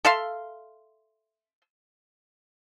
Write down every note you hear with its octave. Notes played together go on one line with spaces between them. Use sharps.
A4 E5 F5 C6